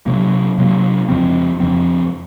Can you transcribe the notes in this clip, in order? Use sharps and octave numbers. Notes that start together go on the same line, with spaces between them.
C3 F#3 A#3
C3 F#3 A#3
F2 C#3 F3 C4
F2 C#3 F3 C4